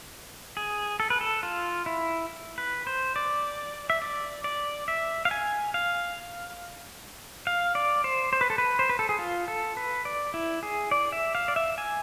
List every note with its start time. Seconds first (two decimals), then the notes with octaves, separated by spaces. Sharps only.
0.57 G#4
1.00 A4
1.10 B4
1.21 A4
1.43 F4
1.86 E4
2.58 B4
2.87 C5
3.16 D5
3.90 E5
4.02 D5
4.44 D5
4.88 E5
5.25 F5
5.31 G#5
5.74 F5
7.47 F5
7.75 D5
8.04 C5
8.33 C5
8.41 B4
8.50 A4
8.58 B4
8.79 C5
8.89 B4
8.99 A4
9.09 G#4
9.19 F4
9.48 A4
9.77 B4
10.05 D5
10.34 E4
10.63 G#4
10.91 D5
11.12 E5
11.35 F5
11.48 D5
11.56 E5
11.78 G#5